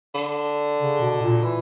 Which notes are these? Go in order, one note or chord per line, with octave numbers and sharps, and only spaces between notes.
D3
C#3
B2
A#2
E3